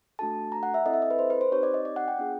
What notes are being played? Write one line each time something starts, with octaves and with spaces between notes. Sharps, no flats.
A3 D4 F#4 A4 A5
A#5
F#5
E5
C4 E4 A4 D#5
E5
D#5
B4
C5
B4
C5
C4 D#4 G4 C#5
D5
D#5
D5
F#5
G5
B3 D4 F4 G#4